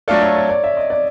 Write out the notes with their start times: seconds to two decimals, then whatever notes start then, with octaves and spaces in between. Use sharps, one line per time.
0.08 F#3 A3 D4 F4 A4 D5
0.21 C#5
0.36 C#5
0.49 D5
0.64 E5
0.77 D#5
0.90 D5